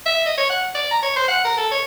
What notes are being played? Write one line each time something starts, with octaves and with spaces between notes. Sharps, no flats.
E5
D#5
C#5
F#5
D5
A#5
C#5
C5
F#5
A#4
A4
C#5